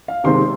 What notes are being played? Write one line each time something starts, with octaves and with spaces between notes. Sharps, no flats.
F5
C3 D#3 G#3 C4 C6